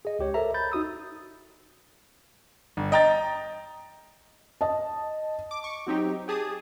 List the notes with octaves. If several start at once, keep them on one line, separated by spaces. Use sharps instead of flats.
G#4 D#5
C#2 G4 C#5
A4 A#4 C5 E5 A#5
B5 G6 A6
D#4 F#4 D#6 E6
G1
D#5 G5 A#5 D#6 A6
D#5 A5
D6
C#6 D6
F#3 C4 D#4 G4
G4 G#4 A5 D#6